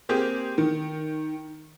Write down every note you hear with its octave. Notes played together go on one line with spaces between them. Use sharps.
A#3 C4 G4 G#4
D#3